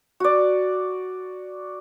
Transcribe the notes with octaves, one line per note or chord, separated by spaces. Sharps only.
F#4 D5